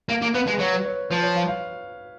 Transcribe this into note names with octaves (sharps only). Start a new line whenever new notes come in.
A#3 F5
A#3
B3 B4
G#3
F#3 C#5
B4
C#5
F3 B4
C#5
F5
F5